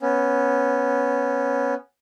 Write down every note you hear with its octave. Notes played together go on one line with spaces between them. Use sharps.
B3 C#4